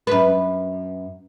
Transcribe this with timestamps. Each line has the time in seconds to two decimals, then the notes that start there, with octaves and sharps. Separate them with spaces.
0.07 F#2 B4